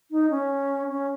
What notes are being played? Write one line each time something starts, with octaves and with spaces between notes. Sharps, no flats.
D#4
C#4
C#4